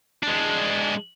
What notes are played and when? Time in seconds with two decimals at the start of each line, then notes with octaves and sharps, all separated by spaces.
0.23 G#3 D4